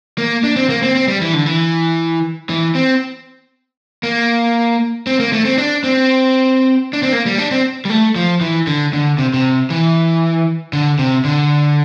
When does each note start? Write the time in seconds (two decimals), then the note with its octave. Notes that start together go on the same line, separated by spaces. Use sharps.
0.18 A#3
0.44 D4
0.56 C4
0.69 A#3
0.83 C4
0.95 C4
1.08 G3
1.21 E3
1.34 D3
1.46 E3
2.49 E3
2.75 C4
4.03 A#3
5.07 C4
5.20 A#3
5.33 A3
5.45 C4
5.58 D4
5.84 C4
6.93 D4
7.03 C4
7.12 A#3
7.26 G3
7.38 D4
7.51 C4
7.85 G3
7.90 A3
8.15 F3
8.41 E3
8.67 D3
8.93 D3
9.18 C3
9.34 C3
9.70 E3
10.73 D3
10.99 C3
11.24 D3